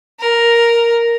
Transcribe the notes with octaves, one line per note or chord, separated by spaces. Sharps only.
A#4